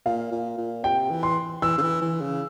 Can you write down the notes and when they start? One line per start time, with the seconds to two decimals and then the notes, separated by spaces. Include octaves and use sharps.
0.06 A#2 F5
0.32 A#2
0.58 A#2
0.84 C3 G5
1.10 E3
1.23 C6
1.62 E3 E6
1.78 C#3
1.82 E3
2.01 E3
2.21 C#3